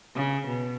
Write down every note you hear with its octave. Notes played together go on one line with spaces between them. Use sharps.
C#3
B2